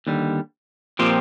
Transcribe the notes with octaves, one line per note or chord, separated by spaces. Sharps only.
D#2 D3 G3
A#2 F3 C4 G4